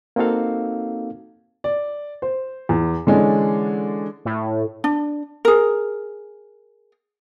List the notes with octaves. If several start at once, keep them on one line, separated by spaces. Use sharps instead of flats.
A#3 C4 D#4 F#4 A4 F5
D5
C5
E2
D3 E3 G#3 C#4 D4
A2
D4
G#4 A#4